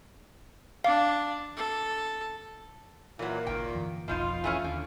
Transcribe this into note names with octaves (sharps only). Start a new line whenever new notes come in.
D4 F5
A4
A#2 E3 F#3
G#1 C#2 D#3 G5
G2 D3 E3
F1 B1 F2 B2 F3 D#4 F4
E3 A3 C#4
D#2 D3